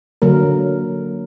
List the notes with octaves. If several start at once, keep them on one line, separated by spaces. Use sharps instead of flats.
D3 F#3 A#3 A#4